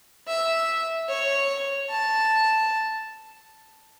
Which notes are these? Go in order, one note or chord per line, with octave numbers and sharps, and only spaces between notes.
E5
C#5
A5